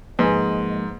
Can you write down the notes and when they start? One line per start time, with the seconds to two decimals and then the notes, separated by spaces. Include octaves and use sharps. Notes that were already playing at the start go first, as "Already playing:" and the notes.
0.19 G#2 F3 G#3 A#3 B4 D#5 G#5